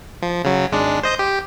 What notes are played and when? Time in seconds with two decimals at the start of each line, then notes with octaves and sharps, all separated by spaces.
0.22 F3
0.44 C#3 F#3
0.72 G#1 G#3 D4
1.03 C5 D#5 G6
1.19 G4